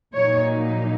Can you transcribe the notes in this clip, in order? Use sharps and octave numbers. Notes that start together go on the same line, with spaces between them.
A#2 F#3 A#3 D#4 C#5